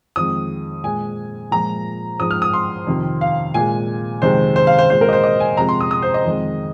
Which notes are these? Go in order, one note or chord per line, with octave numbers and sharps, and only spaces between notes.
F2 D#3 G#3 D#6
A#2 G#3 G#5
A#2 F3 G#3 A#5
G#2 F3 G#3 D#6
F6
D#6
C6
F2 C3 D#3
F5
A#2 G#3 G#5
F2 C3 D#3 G#3 C5
C5
F5
C5
A#2 G#3 C5
A#4
D#5
C5
D#5
G#5
F2 C3 G#3 A#5
C6
D#6
D#6
C5
D#5
F2 D#3 G#3